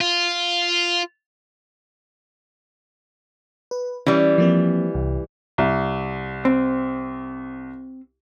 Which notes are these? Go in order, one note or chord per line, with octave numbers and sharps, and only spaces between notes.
F4
B4
E3 G3 C#4
F3 A#3 C4
C2
C2
C4